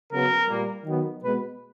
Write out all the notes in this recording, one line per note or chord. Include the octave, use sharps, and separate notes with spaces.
C#3 F#3 B3 A#4
A#2 G3 A#3
D#3 F#3 B3
B2 G#3 B3 B4